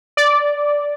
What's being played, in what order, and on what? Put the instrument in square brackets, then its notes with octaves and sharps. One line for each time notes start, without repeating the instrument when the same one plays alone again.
[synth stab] D5